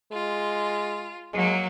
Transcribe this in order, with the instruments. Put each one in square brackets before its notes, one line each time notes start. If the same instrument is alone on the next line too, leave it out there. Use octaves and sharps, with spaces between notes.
[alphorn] G#3 [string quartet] F4
[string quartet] F#3 A#3 [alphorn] G#3